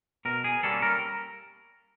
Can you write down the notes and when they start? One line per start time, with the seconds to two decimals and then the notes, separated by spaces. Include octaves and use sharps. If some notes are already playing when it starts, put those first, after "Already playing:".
0.25 B2 A#4
0.44 G#4
0.63 G3 A#3 C#4 A4
0.82 A#4